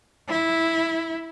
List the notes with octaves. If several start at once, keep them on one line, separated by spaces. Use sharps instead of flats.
E4